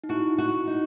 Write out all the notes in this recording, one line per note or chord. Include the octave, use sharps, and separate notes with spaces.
D#4
E4 F#4
F#4
D#4